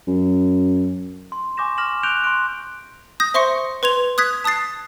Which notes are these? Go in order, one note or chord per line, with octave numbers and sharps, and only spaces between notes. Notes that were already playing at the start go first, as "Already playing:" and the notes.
F#2
C6
G#5 C#6 D6 G6 A#6 E7
D6 F6 A#6 E7 F#7
F#6 G6 D7 F7 G7
C6 C#6 F#6 D7
D#6 G6 A#6
C5 E5 C6 C#6 A#6 C#7
B4 C6 G#6 F7
D#6 F#6 G#6 B6
A5 D#6 F#6 A6 C7